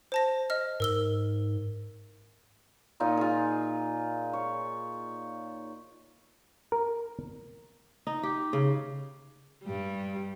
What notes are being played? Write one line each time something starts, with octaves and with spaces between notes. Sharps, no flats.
C5 A5 A#6
D#5 F6
G#2 A#4 E6 G7
A#2 D#4 F4 D#5
F4 G#4
C#5
A#4
D#4
G4
C#3
G2 G3